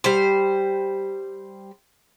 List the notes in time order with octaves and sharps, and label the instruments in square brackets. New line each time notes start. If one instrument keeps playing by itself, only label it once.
[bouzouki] G3 C5